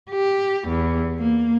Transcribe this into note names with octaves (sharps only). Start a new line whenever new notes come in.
G4
E2
A#3